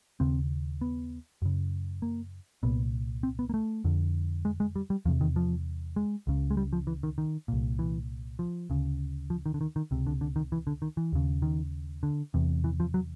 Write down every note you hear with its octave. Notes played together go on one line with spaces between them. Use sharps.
D#2 C#3 C4
B3
F#2 C#3
A#3
C2 A#2 B3
C4
B3
A#3
A3
F2 D3
G#3
G#3
G3
G3
E2 C3 F3
D#3
F3
G#3
C#2 C#3
G#3
G3
F3
E3
D#3
D#3
C2 A#2
E3
F3
D2 C#3
F3
D#3
D3
D#3
D#3
C#2 C3
D3
D3
D#3
E3
D3
D#3
E3
D#2 C#3
D#3
D3
E2 C3
E3
F3
F#3